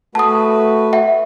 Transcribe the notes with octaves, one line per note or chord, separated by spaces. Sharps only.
A3 F#4 B4 A5 D#6
E5 F#5